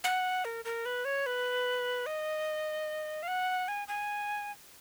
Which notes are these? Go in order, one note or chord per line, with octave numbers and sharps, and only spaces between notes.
F#5
A#4
A#4
B4
C#5
B4
D#5
F5
F#5
G#5
G#5